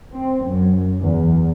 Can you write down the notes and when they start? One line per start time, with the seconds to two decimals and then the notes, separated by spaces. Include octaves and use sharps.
0.13 C4
0.46 F#2
1.00 E2